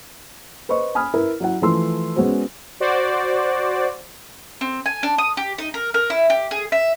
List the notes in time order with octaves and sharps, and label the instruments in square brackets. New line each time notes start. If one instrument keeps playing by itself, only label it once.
[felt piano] B4 C5 D#5 C#6
G#5 B5 D#6 F6
E4 A#4 B4
F#3 E4 F#5
E3 F3 A3 C6 E6
G#3 B3 C#4 F#4 C5
[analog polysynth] F#4 C5 D5
[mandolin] C4
G#5
D4
D#6
G4
D#4
A#4
A#4
E4
G4
G#4
E5